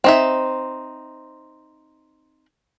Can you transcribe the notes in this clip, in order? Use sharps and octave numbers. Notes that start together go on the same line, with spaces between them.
C4 D#4 E5